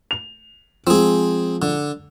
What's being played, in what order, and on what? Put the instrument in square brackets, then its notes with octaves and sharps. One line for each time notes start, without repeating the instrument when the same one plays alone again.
[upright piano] F7
[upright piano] F3 G#3 [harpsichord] C4 G#4
[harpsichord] D3